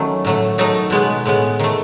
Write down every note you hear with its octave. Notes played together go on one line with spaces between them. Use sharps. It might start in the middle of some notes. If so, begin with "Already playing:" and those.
Already playing: D#3 F#3 A3 C#4
A2 F#3 A3
D#3 F#3 A3 D#4
B2 G#3 B3
A2 G#3 B3
D#3 A3